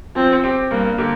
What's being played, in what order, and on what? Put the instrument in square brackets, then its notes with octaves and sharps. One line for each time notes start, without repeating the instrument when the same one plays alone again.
[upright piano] F3 [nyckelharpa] C4
[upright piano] C4 G4
[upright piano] G2 [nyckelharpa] A#3
[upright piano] D3 A#3 G4